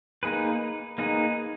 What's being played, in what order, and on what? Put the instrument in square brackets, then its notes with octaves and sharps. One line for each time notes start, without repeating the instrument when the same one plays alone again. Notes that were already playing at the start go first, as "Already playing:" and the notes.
[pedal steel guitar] A#3 D#4 G#4 B4
A#3 D#4 G#4 B4